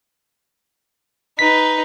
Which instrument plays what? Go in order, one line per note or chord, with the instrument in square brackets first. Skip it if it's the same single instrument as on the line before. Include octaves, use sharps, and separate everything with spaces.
[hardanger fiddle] D#4 B4 [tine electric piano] B6